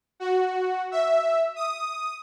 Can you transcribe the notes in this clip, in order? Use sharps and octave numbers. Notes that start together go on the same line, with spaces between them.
F#4
E5
D#6